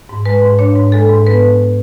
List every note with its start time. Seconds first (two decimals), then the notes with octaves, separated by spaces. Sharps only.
0.09 G#2
0.25 G#3 B4
0.42 G#2
0.59 D4 C#5
0.76 G#2
0.92 G#3 A4
1.09 G#2
1.27 B3 B4